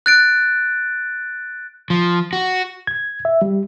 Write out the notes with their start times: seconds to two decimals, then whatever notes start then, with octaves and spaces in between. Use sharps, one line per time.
0.06 F#6 A6 D7
1.90 F3
2.33 F#4
2.87 G#6
3.25 E5
3.42 G3